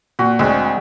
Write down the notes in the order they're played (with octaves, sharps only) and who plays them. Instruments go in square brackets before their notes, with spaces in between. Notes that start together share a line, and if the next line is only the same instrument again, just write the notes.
[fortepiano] A#2 [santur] F#4
[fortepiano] D2 [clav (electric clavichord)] G#3 C4